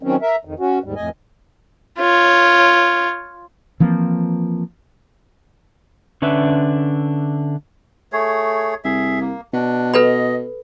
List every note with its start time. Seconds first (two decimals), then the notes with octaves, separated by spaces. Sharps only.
0.03 D#3 F#3 C4 C#4
0.22 A#4 E5
0.45 F2 D#3
0.60 C#4 F#4
0.84 D#2 G#2 G3
0.96 F2 A2 D#5 G#5
1.99 F4 C#5
3.80 E3 F3 A#3 C4
6.22 D3 C#4 D4 B4 E5
8.12 A3 G#4 C#5
8.85 C2 G#4 E5
9.21 A#3
9.53 B2 D4
9.94 A4 B4 D#5 B5